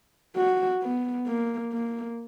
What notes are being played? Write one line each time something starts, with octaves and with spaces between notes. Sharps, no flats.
F#4
B3
A#3
A#3